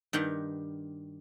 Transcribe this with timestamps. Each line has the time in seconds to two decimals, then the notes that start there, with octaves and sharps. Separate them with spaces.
0.13 G2 D#3 G4 F#5